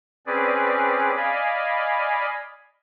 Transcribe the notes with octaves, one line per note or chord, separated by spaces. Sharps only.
C4 C#4 G#4 B4 D5
D5 D#5 F5 G#5 B5